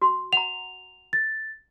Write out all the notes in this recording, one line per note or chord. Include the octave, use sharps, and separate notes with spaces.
F#4 C6
F#5 A#5 F7
A6